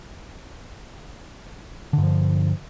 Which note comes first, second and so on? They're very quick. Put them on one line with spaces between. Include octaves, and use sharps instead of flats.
D3 G2 F3